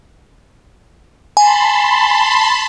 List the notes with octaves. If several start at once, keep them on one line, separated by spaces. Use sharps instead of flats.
G#5 A5 B5 C6